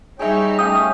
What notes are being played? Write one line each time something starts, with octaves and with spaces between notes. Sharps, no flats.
G3 D#4 G#4 C#5 E5 G5
A3 C#4 G4 F5 D#6